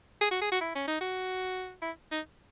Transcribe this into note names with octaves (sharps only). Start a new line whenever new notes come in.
G#4
F#4
G#4
F#4
E4
C#4
D#4
F#4
E4
D#4